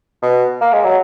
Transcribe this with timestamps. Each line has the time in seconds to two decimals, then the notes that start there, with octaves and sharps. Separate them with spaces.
0.22 B2
0.61 A#3
0.73 G#3
0.84 F#3